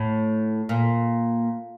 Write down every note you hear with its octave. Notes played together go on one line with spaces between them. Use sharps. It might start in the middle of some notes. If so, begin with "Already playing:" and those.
Already playing: A2
A#2